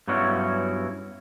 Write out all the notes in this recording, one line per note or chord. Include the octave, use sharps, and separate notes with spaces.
G2 F#3 B3 C#4 E4 F#4